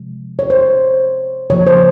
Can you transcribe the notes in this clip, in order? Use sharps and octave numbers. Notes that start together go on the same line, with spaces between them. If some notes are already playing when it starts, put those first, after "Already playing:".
Already playing: C3 F3 G#3
C#5
C5
C#3 F3 A#3 C#5
C5